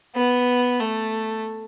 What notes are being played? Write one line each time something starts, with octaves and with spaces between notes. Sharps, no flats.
B3
A3